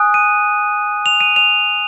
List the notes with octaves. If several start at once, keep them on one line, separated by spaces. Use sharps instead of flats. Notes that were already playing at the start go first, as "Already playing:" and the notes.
Already playing: G#5 D#6 F#6
D#7
F7
D#7
F7